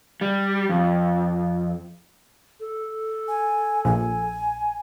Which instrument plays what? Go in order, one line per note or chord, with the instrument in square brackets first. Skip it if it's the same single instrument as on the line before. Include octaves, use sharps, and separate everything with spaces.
[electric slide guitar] G3
F2
[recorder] A4
[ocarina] G#5
[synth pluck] A#1 [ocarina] G#5